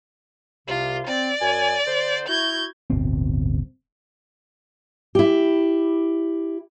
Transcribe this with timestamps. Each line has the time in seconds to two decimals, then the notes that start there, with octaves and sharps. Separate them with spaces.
0.68 C2 C3 F4
1.07 C4 D5
1.41 F#2 G#5
1.87 D3 C5
2.28 E4 F#4 G6 G#6
2.90 D1 G1 B2 C4
5.15 E4 G4